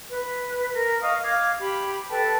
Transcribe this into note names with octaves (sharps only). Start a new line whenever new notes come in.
B4
A#4
D#5 F5 C#6 D#6
F5 D6 G#6
G4 B5
A4 B4 G5 A5